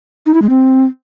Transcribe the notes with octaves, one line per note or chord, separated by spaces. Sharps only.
D#4
E4
G#3
C4